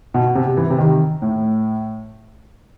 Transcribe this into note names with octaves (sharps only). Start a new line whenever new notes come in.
B2
C3
E3
C3
D#3
A2